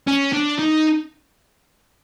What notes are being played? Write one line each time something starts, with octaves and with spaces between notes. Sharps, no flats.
C#4
D4
D#4